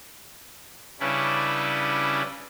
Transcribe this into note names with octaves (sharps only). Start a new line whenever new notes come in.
C#3 G3 C#4 D4 E4 B4